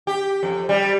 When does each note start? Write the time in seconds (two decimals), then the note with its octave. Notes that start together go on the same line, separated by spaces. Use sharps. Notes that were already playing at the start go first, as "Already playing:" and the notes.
0.07 G4
0.43 F2
0.69 G3